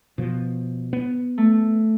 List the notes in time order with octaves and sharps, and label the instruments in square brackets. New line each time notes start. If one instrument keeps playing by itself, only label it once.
[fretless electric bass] B2 F3
B3
[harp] A3